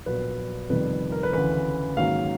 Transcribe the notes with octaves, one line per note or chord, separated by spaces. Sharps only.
A#1 A#2 F#3 B3 B4
G1 F2 C3 D#3 G3 B4
A#4
B4
D2 C#3 E3 B4
G#2 D#3 F#3 A#3 C#4 F5